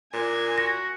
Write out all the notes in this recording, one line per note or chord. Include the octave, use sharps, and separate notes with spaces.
A#2 D4 G#5
F#4 A#6